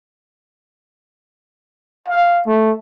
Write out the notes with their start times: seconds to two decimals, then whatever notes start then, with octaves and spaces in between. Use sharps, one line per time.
2.08 F5
2.47 A3